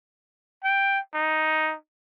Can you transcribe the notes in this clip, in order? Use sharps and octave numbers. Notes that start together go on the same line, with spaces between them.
G5
D#4